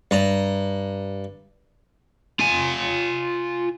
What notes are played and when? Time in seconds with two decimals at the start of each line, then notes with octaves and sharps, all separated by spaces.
0.11 G2 A#5
2.40 F4 G#5